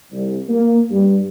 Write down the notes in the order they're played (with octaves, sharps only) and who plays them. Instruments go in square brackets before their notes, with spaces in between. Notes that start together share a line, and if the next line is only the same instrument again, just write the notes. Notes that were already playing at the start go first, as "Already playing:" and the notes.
[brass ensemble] C2
A#3
G2